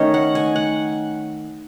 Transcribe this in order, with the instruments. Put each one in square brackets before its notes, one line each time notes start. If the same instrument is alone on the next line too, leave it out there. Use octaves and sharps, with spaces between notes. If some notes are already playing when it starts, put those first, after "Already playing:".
Already playing: [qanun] D#3 A3 C#4 C#5 D#5
F#5
G#5
F#5